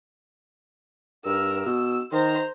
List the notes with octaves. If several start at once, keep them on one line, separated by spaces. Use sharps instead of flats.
G2 A#4 E6
B2 E6
D#3 C5 A#5